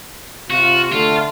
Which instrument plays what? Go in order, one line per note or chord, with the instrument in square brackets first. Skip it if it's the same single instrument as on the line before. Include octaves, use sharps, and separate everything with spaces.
[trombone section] C3 F4 [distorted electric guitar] F#4
[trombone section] D3 A3 [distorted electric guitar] F4